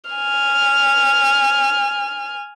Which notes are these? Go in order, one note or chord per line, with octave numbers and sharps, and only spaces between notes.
G#5 F6